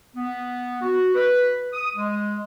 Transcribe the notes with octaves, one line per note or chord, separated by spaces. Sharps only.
B3
F#4
B4
D#6
G#3